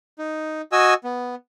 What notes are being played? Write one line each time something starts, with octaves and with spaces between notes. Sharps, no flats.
D#4
F#4 D#5 G#5 E6
B3